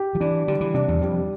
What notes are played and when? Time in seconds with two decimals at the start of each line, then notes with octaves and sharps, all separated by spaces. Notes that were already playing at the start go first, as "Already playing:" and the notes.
Already playing: G4
0.15 F3
0.20 E3 D4
0.48 D3 G3
0.61 E3
0.74 C3 D4
0.88 E2
1.02 F2 G3